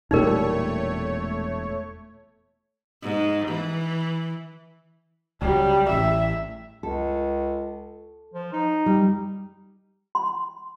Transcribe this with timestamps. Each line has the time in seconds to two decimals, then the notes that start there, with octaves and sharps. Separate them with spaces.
0.11 E1 A#2 G3 A3 D#4 A#4 C#5
3.02 G#2
3.48 E3
5.42 C#2 F#3 G3
5.89 A1 E5
6.83 C#2 A4
8.34 F3
8.52 D#4
8.86 G3
10.15 C6